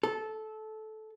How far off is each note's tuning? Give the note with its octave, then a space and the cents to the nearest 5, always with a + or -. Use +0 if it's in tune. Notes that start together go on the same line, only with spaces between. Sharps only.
A4 -15